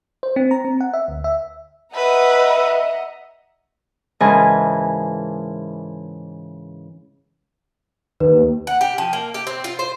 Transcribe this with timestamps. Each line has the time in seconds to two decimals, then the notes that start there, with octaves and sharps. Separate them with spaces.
0.23 C5
0.36 C4
0.51 A#5
0.65 C4
0.81 F#5
0.93 E5
1.08 D2
1.24 E5
1.95 B4 D#5 E5 F#5 A#5
4.20 G#2 C#3 E3 A#4 G#5 A5
8.20 D#2 B4
8.67 F#5
8.81 G4
8.98 F3
9.13 A#3
9.34 G4
9.47 C4
9.64 F4
9.79 C5